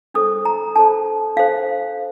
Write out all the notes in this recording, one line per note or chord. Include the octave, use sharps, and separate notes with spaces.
D4 A4 C5 D#6
A#5
D4 A4 C5 A5
D4 A4 C5 F5